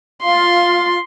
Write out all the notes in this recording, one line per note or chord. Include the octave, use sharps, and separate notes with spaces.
F4 F5 C6